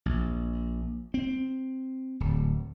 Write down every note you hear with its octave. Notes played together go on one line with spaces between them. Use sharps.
A#1
C4
D1